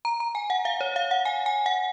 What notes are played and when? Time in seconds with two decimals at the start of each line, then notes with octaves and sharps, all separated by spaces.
0.05 A#5
0.20 A#5
0.35 G#5
0.50 F#5
0.65 F5
0.81 C#5
0.96 F5
1.11 F#5
1.25 G#5
1.46 G#5
1.66 F#5